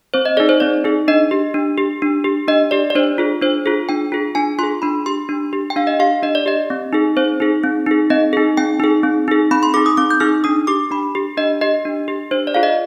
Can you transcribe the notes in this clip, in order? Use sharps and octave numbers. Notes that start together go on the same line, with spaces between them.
C4 C5
D#5
D#4 G#4 D5
C5
C4 D5
D#4 G#4
D4 D#5
G4
D4
G4
D4
G4
D4 D#5
G4 D5
D5
D4 C5
F4 G#4
D4 C5
F4 G#4
D4 G5
F4 G#4
D4 G#5
F4 G#4 C6
D4 B5
G4 C6
D4
G4
G5
D4 F5
D#5
G4 F5
D4 D#5
D5
G4 D#5
C4
D#4 G#4
C4 C5
D#4 G#4
C4
D#4 G#4
C4 D#5
D#4 G#4
C4 G5
D#4 G#4
C4
D#4 G#4
C4 B5
C6
D#4 G#4 D6
D#6
C4 D6
G6
D#4 G#4 F6
D4 D#6
G4 D6
D4 B5
G4
D4 D#5
G4 D#5
D4
G4
D4 C5
D5
F4 G#4 F5
D#5